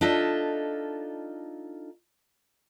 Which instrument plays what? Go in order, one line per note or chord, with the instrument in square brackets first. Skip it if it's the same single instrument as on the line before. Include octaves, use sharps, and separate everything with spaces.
[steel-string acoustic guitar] D4 D#4 F4 A4 D#5 E5